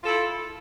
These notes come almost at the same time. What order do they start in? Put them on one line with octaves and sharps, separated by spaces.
F4 A4 E4